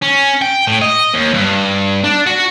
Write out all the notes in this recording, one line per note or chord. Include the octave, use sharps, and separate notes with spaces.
C#4
G5
A2
D#5
D#2
G2
D4
F#4